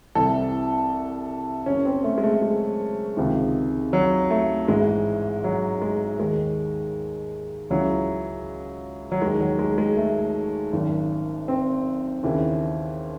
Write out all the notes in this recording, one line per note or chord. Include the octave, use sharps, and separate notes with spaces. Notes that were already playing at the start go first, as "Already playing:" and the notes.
C2 C3 E3 A4
F#1 F#2 C#3 C#4
C4
A3
G#3
A3
G#3
C#2 C3 D#3
F#3
A3
A1 G#2 E3 G#3
F#3
G#3
D#2 D#3 G#3
C#2 C#3 E3 F#3
F#3
D#2 D#3 G#3
F#3
G#3
G#3
A3
G#1 F#2 D#3
C4
D#2 C#3 E3